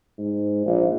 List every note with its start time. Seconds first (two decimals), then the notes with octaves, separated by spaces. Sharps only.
0.18 G#2
0.66 A#1